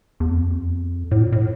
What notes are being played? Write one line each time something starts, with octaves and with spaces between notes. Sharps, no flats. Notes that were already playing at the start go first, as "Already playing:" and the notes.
E2
F2
A2
A#2
A2